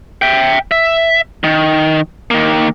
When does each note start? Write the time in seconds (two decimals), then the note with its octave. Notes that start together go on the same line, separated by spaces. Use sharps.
0.22 E5 G5
0.71 E5
1.44 D#3
2.31 D#3 A#3